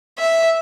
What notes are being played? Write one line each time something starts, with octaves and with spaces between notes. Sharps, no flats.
E5